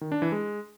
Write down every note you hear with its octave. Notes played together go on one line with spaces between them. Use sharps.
D#3
D4
E3
G#3